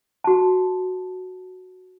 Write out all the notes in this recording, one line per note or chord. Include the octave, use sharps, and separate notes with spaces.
F#4 A5